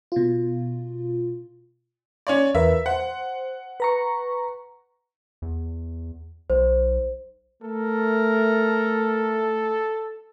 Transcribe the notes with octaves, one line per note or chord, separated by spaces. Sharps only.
B2 F4
C#4 C#5 D5
E2 A#4 B4 E5
C5 F#5
B4 A#5 C#6
E2
B1 C5
A3 A4 A#4